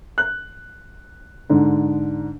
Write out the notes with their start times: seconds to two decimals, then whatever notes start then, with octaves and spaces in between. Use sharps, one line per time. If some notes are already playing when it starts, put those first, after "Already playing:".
0.18 F#6
1.50 G#2 D3